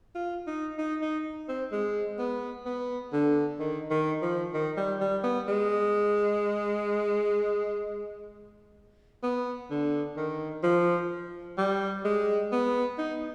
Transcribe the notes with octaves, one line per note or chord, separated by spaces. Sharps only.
F4
D#4
D#4
D#4
C4
G#3
B3
B3
D3
D#3
D#3
F3
D#3
G3
G3
B3
G#3
B3
D3
D#3
F3
G3
G#3
B3
D#4